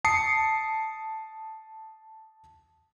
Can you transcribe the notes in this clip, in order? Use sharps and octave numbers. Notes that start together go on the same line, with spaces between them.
A5 D#6 C7 C#7